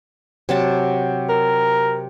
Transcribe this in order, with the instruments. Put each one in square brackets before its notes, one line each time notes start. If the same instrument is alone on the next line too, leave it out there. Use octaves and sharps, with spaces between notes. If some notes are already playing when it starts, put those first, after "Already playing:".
[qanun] C3 F#3 A5
[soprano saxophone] A#4